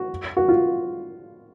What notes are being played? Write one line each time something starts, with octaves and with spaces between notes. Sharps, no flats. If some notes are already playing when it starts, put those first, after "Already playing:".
Already playing: F#4
F#4
F4